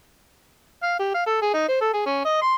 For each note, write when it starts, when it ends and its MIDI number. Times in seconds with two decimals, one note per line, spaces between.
0.83 0.95 77
0.99 1.13 67
1.15 1.26 77
1.27 1.40 69
1.42 1.51 68
1.54 1.63 63
1.68 1.79 72
1.81 1.91 69
1.94 2.04 68
2.06 2.22 61
2.25 2.40 75
2.42 2.55 84